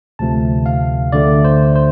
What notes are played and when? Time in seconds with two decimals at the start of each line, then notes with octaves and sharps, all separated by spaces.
0.19 D2 C3 F3 A3 A5
0.66 F5
1.12 D2 D3 A3 D5
1.45 C5
1.75 C5